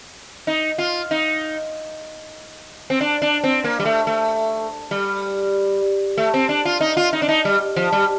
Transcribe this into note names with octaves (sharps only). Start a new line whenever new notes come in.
D#4
F4
D#4
C4
D4
D4
C4
A#3
G3
A3
A3
G3
A3
C4
D4
F4
D#4
F4
D#4
D4
D#4
G3
F3
G3